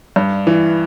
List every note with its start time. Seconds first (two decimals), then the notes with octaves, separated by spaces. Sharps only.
0.16 G2
0.47 E3